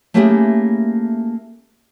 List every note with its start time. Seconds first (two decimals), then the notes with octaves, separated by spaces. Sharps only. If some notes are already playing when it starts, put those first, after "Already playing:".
0.14 A3 A#3 C#4 E4 G4 G#4